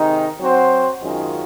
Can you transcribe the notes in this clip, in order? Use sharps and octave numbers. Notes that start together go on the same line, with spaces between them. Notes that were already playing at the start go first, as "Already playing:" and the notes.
Already playing: C3 D#3 G#3 D#4
F#3 C4 F#4 C5
F#2 D#3 G#3 C#4 F4